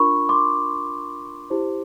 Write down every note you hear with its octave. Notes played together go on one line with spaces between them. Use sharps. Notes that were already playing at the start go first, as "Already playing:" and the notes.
Already playing: D4 F4 A#4 B5 C#6
C6 D6
E4 G4 C5